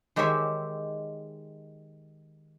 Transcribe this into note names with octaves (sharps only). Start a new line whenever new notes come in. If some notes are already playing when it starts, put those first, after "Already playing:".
D#3 G#3 G4 C5 C#5 E5